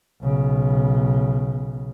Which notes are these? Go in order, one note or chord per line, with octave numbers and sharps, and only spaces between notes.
B1 C#3